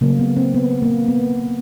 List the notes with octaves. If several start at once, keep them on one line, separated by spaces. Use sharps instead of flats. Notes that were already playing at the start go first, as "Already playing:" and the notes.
C#3 F#3 A3 A#3
B3
C4
B3
A#3
B3